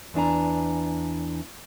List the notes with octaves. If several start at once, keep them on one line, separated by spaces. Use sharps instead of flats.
E2 E3 D4 G#5 A#5